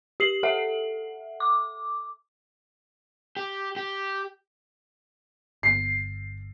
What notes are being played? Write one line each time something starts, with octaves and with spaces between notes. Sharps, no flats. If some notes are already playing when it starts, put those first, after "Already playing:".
G4 C7 F#7
A4 E5 F#5
D6
G4
G4
G1 C7